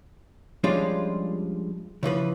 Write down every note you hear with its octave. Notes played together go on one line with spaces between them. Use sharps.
F3 G3 G#3 C#4 D4 F4
C#3 E3 F3 B4